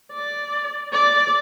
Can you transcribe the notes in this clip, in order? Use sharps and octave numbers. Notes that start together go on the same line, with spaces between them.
D5
D5